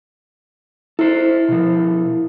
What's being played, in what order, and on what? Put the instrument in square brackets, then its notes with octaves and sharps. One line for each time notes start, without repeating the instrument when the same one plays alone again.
[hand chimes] E4 [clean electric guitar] A4 C5
[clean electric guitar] B2 F3